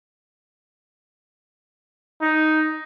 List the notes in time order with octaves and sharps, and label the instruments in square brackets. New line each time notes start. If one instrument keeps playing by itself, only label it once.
[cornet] D#4